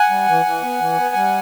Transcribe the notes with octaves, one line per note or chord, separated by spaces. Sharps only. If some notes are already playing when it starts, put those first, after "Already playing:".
Already playing: F#5 G#5
G3
E3
E3
B3
E3
B3
G3